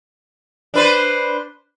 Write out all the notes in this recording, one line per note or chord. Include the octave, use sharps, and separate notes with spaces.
D4 B4 C5